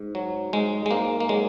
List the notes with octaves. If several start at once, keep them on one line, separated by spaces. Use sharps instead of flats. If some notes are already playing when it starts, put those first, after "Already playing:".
Already playing: G#2
F#3
G#2 G#3
G#3
G#2 A#3
A#3
F#3 G#3